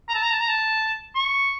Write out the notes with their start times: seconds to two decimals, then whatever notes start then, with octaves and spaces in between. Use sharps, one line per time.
0.09 A#5
0.15 A5
0.23 A#5
0.31 A5
0.40 A#5
0.48 A5
1.15 C#6